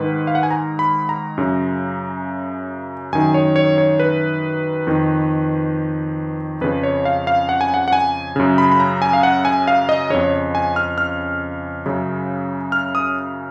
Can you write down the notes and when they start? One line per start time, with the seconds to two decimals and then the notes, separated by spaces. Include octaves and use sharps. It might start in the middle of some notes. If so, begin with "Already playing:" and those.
Already playing: G#2 D#3 B4
0.27 F5
0.35 F#5
0.43 G#5
0.50 A#5
0.79 B5
1.09 A#5
1.37 F#2 C#3
3.13 F#2 D#3 G#5
3.34 C#5
3.56 C#5
3.78 C#5
3.99 B4
4.87 F2 D#3
6.61 F2 C#3 B4
6.83 C#5
7.05 F5
7.27 F5
7.49 F#5
7.61 G#5
7.74 F#5
7.88 F#5
7.93 G#5
8.36 F#2 C#3
8.58 B5
8.71 B5
8.80 A#5
9.02 G#5
9.13 F5
9.23 F#5
9.45 G#5
9.68 F5
9.89 D#5
10.10 F2 C#3 C#5
10.55 G#5
10.76 F6
10.98 F6
11.86 F#2 C#3
12.72 F6
12.95 D#6